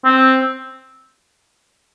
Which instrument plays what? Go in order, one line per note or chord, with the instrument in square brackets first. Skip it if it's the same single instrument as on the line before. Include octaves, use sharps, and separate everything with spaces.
[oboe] C4